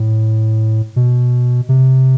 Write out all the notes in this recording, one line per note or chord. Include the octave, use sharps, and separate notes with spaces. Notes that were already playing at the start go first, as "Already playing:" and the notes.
Already playing: A2
B2
C3